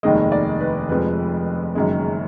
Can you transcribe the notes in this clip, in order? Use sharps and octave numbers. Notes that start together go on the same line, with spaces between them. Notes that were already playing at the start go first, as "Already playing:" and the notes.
F1 D#2 D#3 G#3 D#5
D5
B4
F1 F2 F3 G#3 B4
F#1 F#2 D#3 G#3